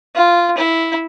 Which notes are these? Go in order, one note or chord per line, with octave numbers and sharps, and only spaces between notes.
F4
E4